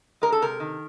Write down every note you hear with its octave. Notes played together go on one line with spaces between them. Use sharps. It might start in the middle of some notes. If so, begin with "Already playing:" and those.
G#3 A#4
A4
C3 A#4
D#3